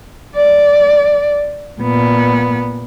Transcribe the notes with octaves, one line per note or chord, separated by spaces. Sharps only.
D5
A#2 B3